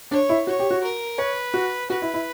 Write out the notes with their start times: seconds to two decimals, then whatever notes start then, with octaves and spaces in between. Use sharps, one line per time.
0.11 D4 C#5
0.29 E4
0.47 F#4 C#5
0.59 G4
0.71 F#4
0.83 A#4
1.18 B4 C#5
1.54 F#4
1.90 F#4 B4
2.02 E4
2.14 E4